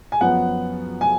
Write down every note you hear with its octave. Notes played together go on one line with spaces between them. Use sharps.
G#5
F#2 F3 B3 F#5
G#5